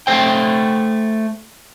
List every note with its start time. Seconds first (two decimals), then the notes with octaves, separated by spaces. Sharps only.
0.07 A3 C5 G5